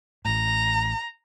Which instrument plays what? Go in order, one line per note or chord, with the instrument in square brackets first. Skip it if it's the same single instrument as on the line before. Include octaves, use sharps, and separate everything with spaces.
[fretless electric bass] A1 A2 [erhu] A#5